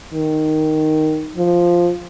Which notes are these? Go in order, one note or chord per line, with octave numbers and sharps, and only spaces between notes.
D#3
F3